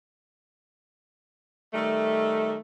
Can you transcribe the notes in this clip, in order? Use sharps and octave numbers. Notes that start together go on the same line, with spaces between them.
D#3 G3 A3